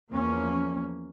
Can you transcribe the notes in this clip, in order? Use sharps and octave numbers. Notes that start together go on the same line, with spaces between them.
E2 F3 A#3 C#4